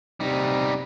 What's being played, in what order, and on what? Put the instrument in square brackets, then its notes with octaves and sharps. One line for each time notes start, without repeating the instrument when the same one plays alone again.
[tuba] C3 [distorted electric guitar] G3 D#4